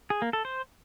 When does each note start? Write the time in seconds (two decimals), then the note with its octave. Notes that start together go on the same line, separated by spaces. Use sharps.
0.10 G#4
0.22 A#3
0.33 A4
0.45 C5